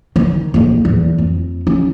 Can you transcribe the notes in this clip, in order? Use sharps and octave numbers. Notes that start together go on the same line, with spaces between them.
D#3
A#1 A2
E2
F2
C#4